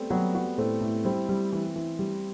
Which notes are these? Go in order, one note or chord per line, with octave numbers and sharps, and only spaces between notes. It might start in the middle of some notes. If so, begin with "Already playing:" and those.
Already playing: G3 A3 B3 C4
F#3 G3 B3
F#4
A2 A3 C4
A2
G3 C4 E4
G3
E3
E3
G3